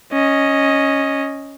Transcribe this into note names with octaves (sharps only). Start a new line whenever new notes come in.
C#4 D#5